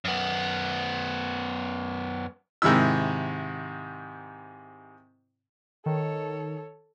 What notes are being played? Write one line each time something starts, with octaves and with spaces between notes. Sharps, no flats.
F#2 B3
G#2 C3 D#3 E4 E6
D#3 A4 C#5